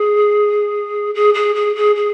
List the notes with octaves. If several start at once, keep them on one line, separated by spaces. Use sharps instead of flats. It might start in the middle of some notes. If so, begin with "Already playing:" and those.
Already playing: G#4
G#4
G#4
G#4
G#4
G#4